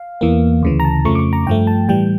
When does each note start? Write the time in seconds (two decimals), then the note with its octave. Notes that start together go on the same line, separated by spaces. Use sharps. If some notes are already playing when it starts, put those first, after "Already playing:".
Already playing: F5
0.21 E2 E3 A#3
0.62 D2 C#3 E3
0.80 A#5
0.85 A5
1.05 F2 C#3 F3 A3 C#6
1.15 D6
1.19 C#6
1.33 A#5
1.47 G2 F3 A3 G5
1.67 A5
1.88 A2 E3 G3 G5